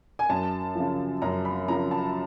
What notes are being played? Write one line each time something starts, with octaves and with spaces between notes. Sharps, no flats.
G#5
F#2 A5
C#3 F3
F#2 A#5
B5
C#3 F3 A#5
A5